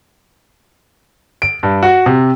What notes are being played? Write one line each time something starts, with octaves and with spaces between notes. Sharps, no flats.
D7
G2
F#4
C3